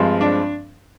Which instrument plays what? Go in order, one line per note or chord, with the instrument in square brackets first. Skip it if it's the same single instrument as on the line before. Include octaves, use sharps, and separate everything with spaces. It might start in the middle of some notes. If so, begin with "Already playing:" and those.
Already playing: [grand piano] G2 F3 G#3 C4
D4